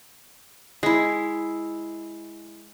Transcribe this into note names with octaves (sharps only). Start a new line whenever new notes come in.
G#3 E4